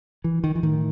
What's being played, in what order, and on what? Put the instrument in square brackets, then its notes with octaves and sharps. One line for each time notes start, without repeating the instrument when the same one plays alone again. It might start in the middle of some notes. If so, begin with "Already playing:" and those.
[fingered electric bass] E3
D#3
E3
A2 D#3